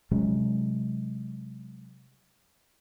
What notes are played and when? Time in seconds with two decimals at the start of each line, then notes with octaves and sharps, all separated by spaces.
0.11 C3 F#3 G#3 C#4